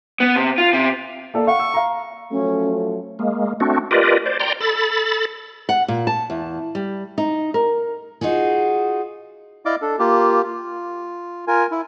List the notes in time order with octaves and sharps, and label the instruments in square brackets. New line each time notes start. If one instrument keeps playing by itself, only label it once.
[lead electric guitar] B3
C3
F4
C3
[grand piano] A#3 A4 D5
[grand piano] F5 F#5 [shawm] C#6
[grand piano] E6
F5 A#5
[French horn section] F3 F#3 A3 [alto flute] C#4
[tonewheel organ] G#3 A#3
A3 C4 D4 F#4
F4 G4 A#4 B4 D5 D#5
C5 D5
D5 G5 A#5 C6
A4 B5 A6
[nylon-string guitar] F#5
A#2
A5
E2
G3
D#4
A#4
[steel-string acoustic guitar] D#4 F4 F#4 G#4
[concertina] E4 D5 D#5 F5 D6
D4 A4
A#3 F4 G4
F4
F4 A#4 G#5
E4